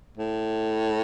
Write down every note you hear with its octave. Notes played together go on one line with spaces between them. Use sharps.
A2